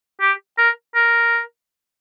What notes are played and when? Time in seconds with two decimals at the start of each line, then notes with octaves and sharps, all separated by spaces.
0.21 G4
0.58 A#4
0.95 A#4